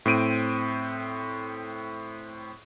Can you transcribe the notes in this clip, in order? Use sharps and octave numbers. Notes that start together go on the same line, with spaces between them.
A2 C4 D7 D#7